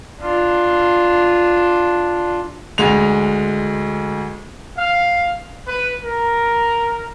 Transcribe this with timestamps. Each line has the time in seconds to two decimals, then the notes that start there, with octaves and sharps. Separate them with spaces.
0.22 D4 F4
2.78 D2 G#3 F7
4.77 F5
5.68 B4
6.03 A#4